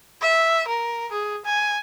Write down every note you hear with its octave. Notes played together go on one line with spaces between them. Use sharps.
E5
A#4
G#4
G#5